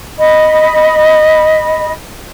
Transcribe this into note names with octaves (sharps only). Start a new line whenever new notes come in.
D#5 B5